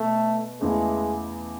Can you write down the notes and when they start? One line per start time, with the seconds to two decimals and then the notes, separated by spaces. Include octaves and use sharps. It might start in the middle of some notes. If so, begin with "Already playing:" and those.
Already playing: B2 A3
0.61 E2 C#3 E3 G#3 A3 E4